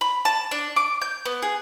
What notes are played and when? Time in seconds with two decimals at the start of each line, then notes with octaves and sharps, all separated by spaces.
0.01 B5
0.25 A5
0.51 D4
0.76 D6
1.02 G6
1.25 B3
1.42 G#4